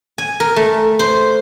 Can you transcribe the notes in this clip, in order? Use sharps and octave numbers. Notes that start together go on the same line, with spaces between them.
G#5
A#4
A3
C5